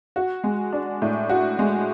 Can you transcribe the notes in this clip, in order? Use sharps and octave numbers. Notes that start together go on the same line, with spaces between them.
F#4
G#3
D4
A2
F#4
G#3